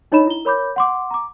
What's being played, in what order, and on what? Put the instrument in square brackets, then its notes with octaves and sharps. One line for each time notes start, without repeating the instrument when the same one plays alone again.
[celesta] D4 D#4 C#5 D#5 B5 E7
E4 G7
A#4 C#5 B5 D6 G6
F#5 C6 D6
A#5 D6